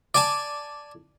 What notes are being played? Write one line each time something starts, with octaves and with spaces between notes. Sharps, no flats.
D5 G#5 A5